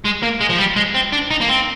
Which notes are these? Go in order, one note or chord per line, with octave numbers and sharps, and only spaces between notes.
G#3
A#3
G#3
F3
G3
G#3
C4
D4
D#4
A#3
C4